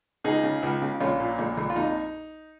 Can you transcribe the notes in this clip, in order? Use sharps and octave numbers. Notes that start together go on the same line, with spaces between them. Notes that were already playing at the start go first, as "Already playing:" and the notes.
C#2 D#4 G#4
C#3
C#2
C#3
A#1 C#4 F4
A#2
A#1
A#1
F4
F2 D#4